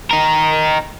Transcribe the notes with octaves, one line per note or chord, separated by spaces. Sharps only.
D#4 A#4